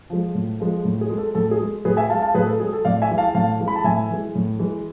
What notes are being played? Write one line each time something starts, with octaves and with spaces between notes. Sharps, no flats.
F3 G#3
A2
F3 G#3
A2
G#4
G#3
A4
A2 A4
G#4
G#3
A2 G#4 B4
E5 G#5
G#3 F5 A5
F5 A5
A2 G#4 B4
A4
G#3 G#4
A4
A2 D5 F5
E5 G#5
E3 G#3
F5 A5
A2 F5 A5
E3 G#3
B5
A5
A2 E5 G#5
E3 G#3
A2
E3 G#3